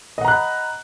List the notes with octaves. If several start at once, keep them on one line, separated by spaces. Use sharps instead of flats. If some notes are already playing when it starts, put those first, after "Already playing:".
D#5 F#5 A#5 B5 F#6